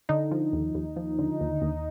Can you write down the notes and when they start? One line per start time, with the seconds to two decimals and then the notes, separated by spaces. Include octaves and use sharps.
0.09 D3 D#4
0.31 F3
0.53 D#2
0.75 D#2
0.96 F3
1.19 D3
1.41 D#2
1.62 D#2